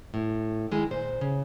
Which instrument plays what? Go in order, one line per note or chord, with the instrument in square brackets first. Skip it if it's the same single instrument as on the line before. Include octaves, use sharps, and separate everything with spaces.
[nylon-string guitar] A2
D#3 G#3 E4
A#2 C5
C#3